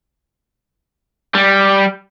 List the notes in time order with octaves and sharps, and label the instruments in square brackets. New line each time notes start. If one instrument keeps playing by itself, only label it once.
[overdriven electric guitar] G3